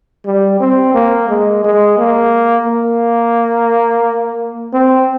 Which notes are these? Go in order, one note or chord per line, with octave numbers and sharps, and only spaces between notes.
G3
C4
A#3
G#3
G#3
A#3
A#3
C4